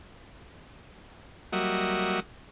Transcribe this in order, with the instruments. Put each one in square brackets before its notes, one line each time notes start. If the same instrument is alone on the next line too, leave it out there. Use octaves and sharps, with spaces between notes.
[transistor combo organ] F#3 G3 A#3 F#4 D#5 E5